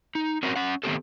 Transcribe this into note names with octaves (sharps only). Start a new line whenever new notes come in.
D#4
C4 C#4 F#4 A#4
C#4 F#5
D#3 A3 B3 C4 G4 A4